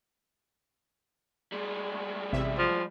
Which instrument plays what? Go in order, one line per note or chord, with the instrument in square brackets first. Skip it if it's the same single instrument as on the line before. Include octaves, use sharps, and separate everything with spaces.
[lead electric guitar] G3 G#3
[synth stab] A1 C3 E5
[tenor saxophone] F3